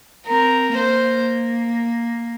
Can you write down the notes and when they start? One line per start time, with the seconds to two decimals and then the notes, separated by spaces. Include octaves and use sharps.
0.27 C4 A#4
0.76 A#3 C5